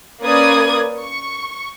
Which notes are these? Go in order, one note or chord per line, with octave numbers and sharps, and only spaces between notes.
A#3 C#4 B4 D5 D#6 G#6
C#6